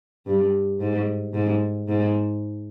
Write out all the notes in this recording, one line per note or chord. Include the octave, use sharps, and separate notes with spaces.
G2
G#2
G#2
G#2